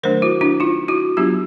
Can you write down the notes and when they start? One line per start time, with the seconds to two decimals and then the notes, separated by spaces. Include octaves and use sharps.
0.03 D#3 F#3 A3 D4 A#4 C5
0.22 E4 F#4
0.41 D4 E4
0.60 D#4 F4
0.88 E4 F#4
1.17 F#3 B3 D4 F4 G4